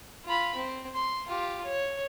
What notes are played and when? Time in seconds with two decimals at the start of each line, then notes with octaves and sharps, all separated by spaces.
0.25 F4 B5
0.55 C4
0.94 C6
1.26 F4 G4
1.64 C#5